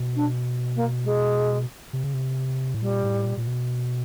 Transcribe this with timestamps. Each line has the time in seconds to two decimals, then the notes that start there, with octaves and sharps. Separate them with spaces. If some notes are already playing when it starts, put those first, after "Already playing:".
Already playing: B2
0.16 D4
0.75 A#3
1.04 G#3
1.93 C3
2.04 C#3
2.14 C3
2.74 A2
2.81 A#2 G3
3.04 A2
3.25 A#2
3.37 A#2
3.47 B2